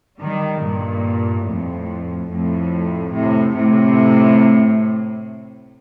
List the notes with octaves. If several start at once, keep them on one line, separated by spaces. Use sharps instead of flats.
D#3 G3
G2 A#2
F2 A2
F2 A2
A2 C3
A2 C3